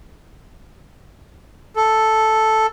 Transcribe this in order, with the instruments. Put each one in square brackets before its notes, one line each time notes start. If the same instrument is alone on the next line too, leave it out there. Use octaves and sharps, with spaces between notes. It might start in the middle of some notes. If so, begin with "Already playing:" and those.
[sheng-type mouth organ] A4